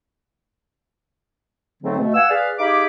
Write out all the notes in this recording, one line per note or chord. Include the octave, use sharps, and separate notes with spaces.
G#2 D3 F#3 A3 C4
B2 A3
F5 F#5 G#5 E6
G#4 B4 D5 F5
D#4 G4 G#4 F5 B5 D6